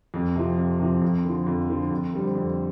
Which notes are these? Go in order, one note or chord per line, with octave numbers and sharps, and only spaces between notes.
F2
C3 F3
F2
C3 F3
F2
D3 F3
F2
D3 F3
F2
D3 G3 C4
F2